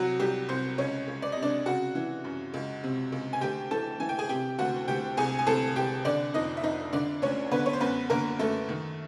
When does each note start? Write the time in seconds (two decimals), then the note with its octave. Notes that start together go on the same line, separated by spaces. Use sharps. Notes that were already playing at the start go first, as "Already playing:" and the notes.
Already playing: C2 F#3 F#4
0.19 C2 G3 G4
0.48 C2 C4 C5
0.78 C#2 C#4 C#5
1.08 C#2
1.22 D5
1.32 C3 D#5
1.42 D4 D5
1.66 C#3 F#4 F#5
1.95 E3
2.24 F#2
2.54 C#2
2.83 C3
3.12 C#2
3.33 G#5
3.41 D2 G4 G5
3.71 E3 A4 A5
4.00 E3 G#5
4.09 G5
4.19 G#4 G#5
4.29 C3 G4 G5
4.59 D2 F#4 F#5
4.88 D2 G4 G5
5.17 C2 G#4 G#5
5.39 G#5
5.46 C2 A4 A5
5.76 C2 G4 G5
6.05 D3 D4 D5
6.34 F2 D#4 D#5
6.57 E5
6.63 F2 D#4 D#5
6.93 D3 D4 D5
7.22 D2 C#4 C#5
7.51 D3 B3 B4
7.66 C#5
7.73 C5
7.81 F#2 B3 B4
8.10 D3 A#3 A#4
8.39 F#2 A3 A4
8.69 D#3